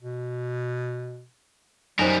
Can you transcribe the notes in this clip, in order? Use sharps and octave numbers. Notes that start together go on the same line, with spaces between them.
B2
F#2 F#3 G3 D#4 A#4 C5 G#5 A#6